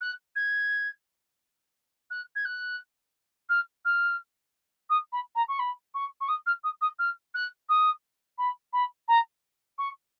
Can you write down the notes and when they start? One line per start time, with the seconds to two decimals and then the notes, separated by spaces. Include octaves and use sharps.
0.01 F#6
0.35 G#6
2.10 F#6
2.35 G#6
2.44 F#6
3.49 F6
3.84 F6
4.89 D#6
5.12 B5
5.35 A#5
5.48 C#6
5.59 B5
5.94 C#6
6.20 C#6
6.28 D#6
6.46 F6
6.63 D#6
6.81 D#6
6.98 F6
7.34 F#6
7.69 D#6
8.38 B5
8.72 B5
9.08 A#5
9.78 C#6